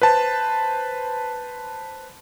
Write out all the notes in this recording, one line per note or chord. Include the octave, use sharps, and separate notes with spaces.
B4 C5 A5